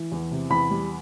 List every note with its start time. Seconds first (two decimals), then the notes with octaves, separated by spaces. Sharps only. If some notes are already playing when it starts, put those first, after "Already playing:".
Already playing: E3
0.12 E2
0.31 C3
0.50 E2 B5
0.70 G3